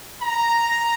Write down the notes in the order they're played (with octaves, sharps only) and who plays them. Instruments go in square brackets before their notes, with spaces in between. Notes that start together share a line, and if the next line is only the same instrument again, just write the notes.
[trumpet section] A#5